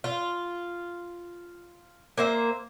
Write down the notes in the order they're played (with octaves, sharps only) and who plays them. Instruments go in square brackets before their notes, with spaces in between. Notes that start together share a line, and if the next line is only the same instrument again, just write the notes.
[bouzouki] F4
A#3 C5 E5